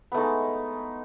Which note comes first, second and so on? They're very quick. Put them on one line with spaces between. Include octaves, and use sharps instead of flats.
B3 A3 D#4 G#3